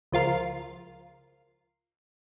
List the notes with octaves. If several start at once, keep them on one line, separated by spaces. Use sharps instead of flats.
C#2 F3 F4 A#4 C6